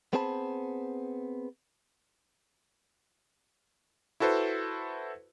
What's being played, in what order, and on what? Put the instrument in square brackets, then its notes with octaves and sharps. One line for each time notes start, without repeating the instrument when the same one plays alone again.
[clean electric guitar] B3 C4 G#4 C5 A5 B5
[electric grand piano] E4 F#4 A4 B4 C5